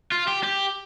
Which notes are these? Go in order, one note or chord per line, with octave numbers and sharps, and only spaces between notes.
F4
G4
G4